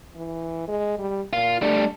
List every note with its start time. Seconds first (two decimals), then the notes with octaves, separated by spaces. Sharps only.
0.16 E3
0.68 G#3
0.99 G3
1.33 A#2 F4
1.62 G3 A3 D4